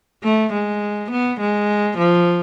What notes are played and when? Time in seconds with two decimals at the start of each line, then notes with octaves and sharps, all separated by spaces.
0.24 A3
0.53 G#3
1.11 B3
1.40 G#3
1.98 F3